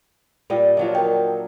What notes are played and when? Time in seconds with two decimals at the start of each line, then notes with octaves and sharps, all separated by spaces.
0.50 A#2 G3 D#5
0.77 F3 F#3 D4 D#5
0.95 A#4 G5